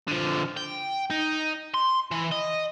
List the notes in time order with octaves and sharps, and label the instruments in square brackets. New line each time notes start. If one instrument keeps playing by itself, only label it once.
[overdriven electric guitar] D3 F3
G5
D#4
C6
E3
D#5